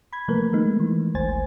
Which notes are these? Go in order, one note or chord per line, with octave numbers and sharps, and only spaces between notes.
B5 G#6
C3 F3 A3 A#3 A#4 B4
D#3 G#3 A3 B3 D#4
E3
G#1 D2 D#3 C5 G#5 A6